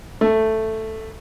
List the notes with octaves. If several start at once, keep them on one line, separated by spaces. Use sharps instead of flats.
A3